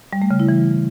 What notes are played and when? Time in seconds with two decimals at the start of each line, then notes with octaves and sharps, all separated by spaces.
0.13 G3
0.22 A3
0.31 C#3
0.40 E4
0.49 E3